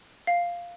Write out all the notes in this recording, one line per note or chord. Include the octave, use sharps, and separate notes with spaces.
F5